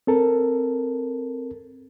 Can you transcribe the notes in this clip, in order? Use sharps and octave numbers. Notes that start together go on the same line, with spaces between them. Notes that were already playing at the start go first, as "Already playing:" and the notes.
C4 A4 A#4